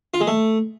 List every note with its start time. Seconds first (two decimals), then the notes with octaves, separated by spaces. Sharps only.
0.14 F4
0.21 G#3
0.27 A3